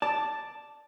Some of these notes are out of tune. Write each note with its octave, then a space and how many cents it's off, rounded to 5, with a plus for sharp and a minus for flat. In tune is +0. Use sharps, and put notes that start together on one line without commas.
D5 +0 A5 +0